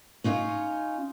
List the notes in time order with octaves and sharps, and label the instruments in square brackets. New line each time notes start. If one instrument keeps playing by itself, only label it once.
[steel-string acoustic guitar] C#4 D#4 F4 C#5